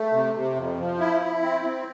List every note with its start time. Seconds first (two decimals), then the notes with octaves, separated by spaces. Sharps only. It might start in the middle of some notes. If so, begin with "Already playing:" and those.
Already playing: A3
0.13 C3
0.35 C3
0.56 F2
0.78 F3
0.99 E4
1.21 E4
1.43 C4
1.64 C4